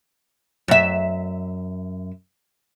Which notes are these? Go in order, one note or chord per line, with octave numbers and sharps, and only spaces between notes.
F#2 E5